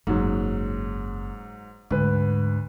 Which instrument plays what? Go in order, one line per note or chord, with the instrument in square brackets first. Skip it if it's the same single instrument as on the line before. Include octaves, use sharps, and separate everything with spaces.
[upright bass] F#1 [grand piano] G#2 F#3
[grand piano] D2 B4 [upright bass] G#2